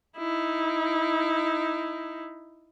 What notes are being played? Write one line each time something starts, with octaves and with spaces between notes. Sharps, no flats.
D#4 E4